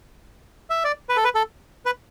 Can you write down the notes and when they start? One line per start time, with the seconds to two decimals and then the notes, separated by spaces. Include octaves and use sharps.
0.70 E5
0.84 D5
1.09 B4
1.16 A4
1.24 B4
1.35 A4
1.86 B4